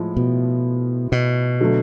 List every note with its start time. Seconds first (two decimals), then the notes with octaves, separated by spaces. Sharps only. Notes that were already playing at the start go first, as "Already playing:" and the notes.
Already playing: A2 F3 G#3
0.17 B2
1.12 B2
1.60 D3 F#3 A3